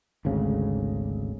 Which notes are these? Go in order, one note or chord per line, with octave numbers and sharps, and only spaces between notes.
G#1 D2 C#3